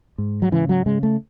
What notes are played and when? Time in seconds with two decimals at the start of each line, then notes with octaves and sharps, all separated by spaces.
0.18 G#2
0.42 F#3
0.52 C#3 E3
0.69 F#3
0.86 C#3 G#3
1.03 A3